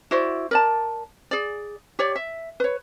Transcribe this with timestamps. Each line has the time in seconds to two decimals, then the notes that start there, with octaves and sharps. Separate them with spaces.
0.11 E4 F#4 C5 D5
0.51 A#4 D5 A5
1.31 G#4 D5
1.99 G4 C#5 D5
2.15 E5
2.60 B4 C#5